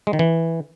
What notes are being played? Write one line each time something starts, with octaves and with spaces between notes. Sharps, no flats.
G#3
D#3
E3